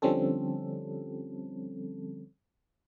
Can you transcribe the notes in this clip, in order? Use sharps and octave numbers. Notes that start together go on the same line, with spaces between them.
D3 F3 G3 C4 C#4 A4